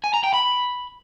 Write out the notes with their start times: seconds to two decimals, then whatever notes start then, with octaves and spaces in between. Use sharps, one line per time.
0.04 G#5
0.14 A#5
0.24 G5
0.34 B5